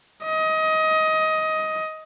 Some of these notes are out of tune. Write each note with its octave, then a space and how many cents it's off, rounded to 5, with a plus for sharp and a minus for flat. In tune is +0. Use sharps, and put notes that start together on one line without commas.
D#5 +20